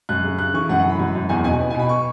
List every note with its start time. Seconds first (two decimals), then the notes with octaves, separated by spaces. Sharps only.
0.09 F#2 F#6
0.24 C#3
0.39 C#3 F#6
0.54 E3 C#6
0.69 F#2 F#5
0.80 F#5
0.84 E3 B5
0.99 F#2
1.15 F#2
1.29 E2 G#5
1.44 B2 G#5
1.59 B3
1.70 G#5
1.74 B2 B5
1.89 C#6